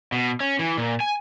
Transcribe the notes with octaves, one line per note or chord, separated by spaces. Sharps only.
B2
C#4
E3
A#2
G#5